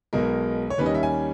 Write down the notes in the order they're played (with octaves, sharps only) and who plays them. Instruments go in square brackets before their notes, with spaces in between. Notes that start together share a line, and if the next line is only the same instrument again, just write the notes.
[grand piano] B1 B2 G#3 A#4
C#5
D#2 D#3 G3 C#4 B4
D#5
E5
G#5